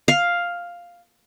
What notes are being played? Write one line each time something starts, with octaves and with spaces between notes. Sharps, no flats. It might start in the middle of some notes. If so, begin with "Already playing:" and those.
F5